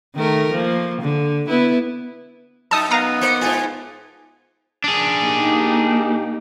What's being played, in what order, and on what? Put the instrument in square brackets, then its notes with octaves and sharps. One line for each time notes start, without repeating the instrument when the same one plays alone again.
[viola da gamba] D#3 A3 A#4
F3 A#3
D3
B3 E4 B4
[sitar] F#2 D#4 [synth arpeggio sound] A5 D#6 [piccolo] E6
[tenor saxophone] B3 [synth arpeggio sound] F5 A#5 A#6 [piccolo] D#7
[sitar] A#3 C5 [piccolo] C#7
[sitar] G#2 D3 F4 [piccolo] G#5
[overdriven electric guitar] D4 G#4
[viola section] A#3 D#4 G4